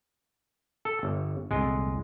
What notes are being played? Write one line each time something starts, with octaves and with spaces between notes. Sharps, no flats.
A4
G1
C2 F2 A#2 G#3